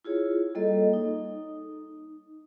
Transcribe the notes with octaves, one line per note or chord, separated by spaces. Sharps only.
E4 F4 G#4 C#5
G3 A#3 A4 D#5
D#4